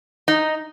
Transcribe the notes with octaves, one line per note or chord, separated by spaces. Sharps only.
D#4